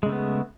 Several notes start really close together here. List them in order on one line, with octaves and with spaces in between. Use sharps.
G#3 C#3 A3 B3